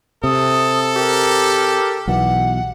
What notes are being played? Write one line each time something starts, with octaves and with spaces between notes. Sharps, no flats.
C3 A4 D#6
G4 A#4
B1 B2 E3 F#5